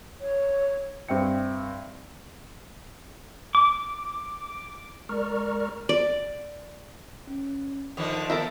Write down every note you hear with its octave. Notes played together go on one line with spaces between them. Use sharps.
C#5
G2 C4 E5 G5 C#7
D6
G#3 A#4 D5 A#5 C#6 F6
D5
C#4
D3 D#3 F3 D#5 D#6
B3 A4 A#4 E5